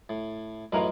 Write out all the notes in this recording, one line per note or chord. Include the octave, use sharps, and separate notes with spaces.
A2
F#2 A2 E3 F4 A#4 D#5